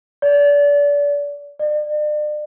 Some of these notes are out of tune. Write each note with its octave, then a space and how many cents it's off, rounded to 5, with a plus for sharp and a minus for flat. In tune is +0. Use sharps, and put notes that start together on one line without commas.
D5 -30
D5 +40